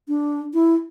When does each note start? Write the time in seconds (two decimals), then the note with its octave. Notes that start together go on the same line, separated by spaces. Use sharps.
0.08 D4
0.54 E4